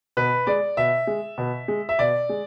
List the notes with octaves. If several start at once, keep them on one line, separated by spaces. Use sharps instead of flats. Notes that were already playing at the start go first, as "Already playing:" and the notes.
B2 B4
G#3 D5
B2 E5
G#3
B2
G#3
E5
B2 D5
G#3